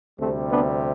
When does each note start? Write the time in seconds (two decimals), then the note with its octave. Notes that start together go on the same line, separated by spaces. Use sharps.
0.19 D2 C3 G3 A3 C4
0.50 B3 D4